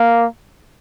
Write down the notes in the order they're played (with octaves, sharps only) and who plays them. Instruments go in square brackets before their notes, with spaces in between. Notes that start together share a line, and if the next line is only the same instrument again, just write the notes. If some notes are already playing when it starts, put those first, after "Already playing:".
Already playing: [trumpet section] A#3